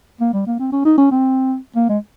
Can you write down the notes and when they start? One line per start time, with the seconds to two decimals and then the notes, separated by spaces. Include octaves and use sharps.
0.20 A#3
0.33 G3
0.46 A#3
0.59 C4
0.72 C#4
0.85 D#4
0.98 C#4
1.11 C4
1.75 A#3
1.89 G#3